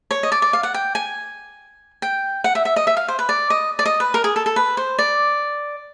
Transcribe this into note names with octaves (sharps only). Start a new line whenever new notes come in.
C#5
D#5
D5
D5
F5
F#5
G5
G#5
G5
F#5
E5
E5
D#5
E5
F5
C5
B4
D5
D#5
D5
D#5
B4
A#4
G#4
A4
A4
B4
C5
D5